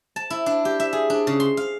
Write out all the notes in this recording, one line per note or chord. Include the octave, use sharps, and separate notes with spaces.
A5
E4
D4
G4
E5
G#4
D4
C#3
C6
F5